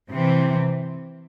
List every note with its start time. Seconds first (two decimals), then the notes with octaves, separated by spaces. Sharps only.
0.11 C3 E3 C4